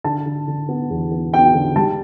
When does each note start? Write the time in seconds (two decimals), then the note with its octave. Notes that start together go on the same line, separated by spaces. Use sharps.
0.04 D3 A5
0.26 D3
0.48 D3
0.69 B3
0.90 E2
1.11 B3
1.33 B3 G5
1.54 D3
1.76 G3 A5